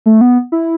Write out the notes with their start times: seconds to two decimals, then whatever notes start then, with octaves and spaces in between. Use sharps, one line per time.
0.06 A3
0.21 B3
0.52 E4